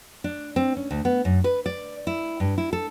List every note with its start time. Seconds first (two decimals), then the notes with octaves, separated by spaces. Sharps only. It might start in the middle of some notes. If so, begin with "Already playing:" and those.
0.24 D4
0.56 C4
0.77 C#4
0.91 D2
1.05 B3
1.25 F#2
1.44 B4
1.66 D5
2.07 E4
2.40 G2
2.58 E4
2.73 A4